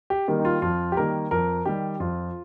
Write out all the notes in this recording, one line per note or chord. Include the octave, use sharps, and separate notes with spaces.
G4
D#3 G3 A#3
D#4
F4
F2 F4
G4
D#3 G3 A#3 A#4
F2 A#4
D#3 G3 G4
F2 F4